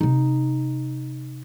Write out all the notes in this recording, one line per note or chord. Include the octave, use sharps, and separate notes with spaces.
C3 D#4